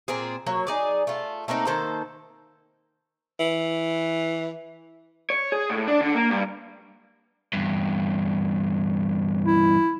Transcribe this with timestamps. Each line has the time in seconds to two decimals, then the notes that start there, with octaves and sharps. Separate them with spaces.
0.08 A#2 C4 F4 G#4
0.47 F#3 A#3 C#5
0.67 D#4 G#4 D5
1.07 A3 F4
1.48 A3 A#3 C4 D#4
1.67 D#3 A#3 A4 C5
3.40 E3
5.30 C#5
5.52 G#4
5.70 A2
5.88 D4
6.01 D3
6.15 A#3
6.31 G2
7.53 E2 G2
9.46 E4